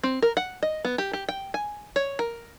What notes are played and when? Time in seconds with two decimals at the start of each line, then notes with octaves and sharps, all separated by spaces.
0.04 C4
0.22 A#4
0.37 F#5
0.63 D#5
0.85 B3
0.98 G4
1.13 G4
1.29 G5
1.54 G#5
1.96 C#5
2.19 A#4